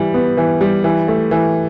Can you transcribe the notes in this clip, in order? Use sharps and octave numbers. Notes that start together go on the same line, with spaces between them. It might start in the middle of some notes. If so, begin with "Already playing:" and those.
Already playing: E3 G3
B3
E3
G3
E3
A3
E3